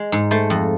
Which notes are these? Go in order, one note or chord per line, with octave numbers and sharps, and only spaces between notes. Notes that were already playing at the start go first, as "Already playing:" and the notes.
Already playing: G#3
G#2
A3 C5
F2